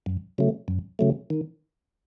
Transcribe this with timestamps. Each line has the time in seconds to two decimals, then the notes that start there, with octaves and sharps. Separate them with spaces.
0.06 F#2
0.38 C#3 F#3 A3
0.68 F#2
0.99 C#3 F#3 A3
1.30 D#3